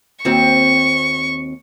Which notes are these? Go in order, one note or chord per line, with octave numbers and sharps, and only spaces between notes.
D#2 C4 F#4 C#6